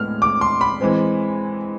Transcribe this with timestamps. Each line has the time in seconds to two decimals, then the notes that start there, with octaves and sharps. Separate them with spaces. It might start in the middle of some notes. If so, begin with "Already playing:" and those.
Already playing: A2 G#3 B3 F6
0.22 D6
0.41 C6
0.61 B5
0.81 E3 G#3 C4